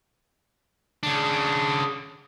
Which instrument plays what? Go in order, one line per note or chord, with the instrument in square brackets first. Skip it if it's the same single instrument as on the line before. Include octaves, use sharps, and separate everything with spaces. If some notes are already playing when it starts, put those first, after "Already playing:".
[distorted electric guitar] C#3 D4